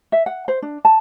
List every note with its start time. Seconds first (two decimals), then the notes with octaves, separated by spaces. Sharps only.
0.12 E5
0.26 F#5
0.48 C5
0.62 D4
0.85 A5